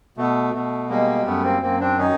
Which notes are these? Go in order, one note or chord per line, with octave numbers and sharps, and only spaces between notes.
B2 A3
B2 A3
G3 G#3 A#3
F#2 A3 B3
A#3 C4
F#2 A#3 C4
C4 D4
D#3 C#4 D#4